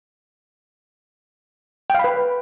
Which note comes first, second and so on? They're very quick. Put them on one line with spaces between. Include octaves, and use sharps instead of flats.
G5 F5 B5 B4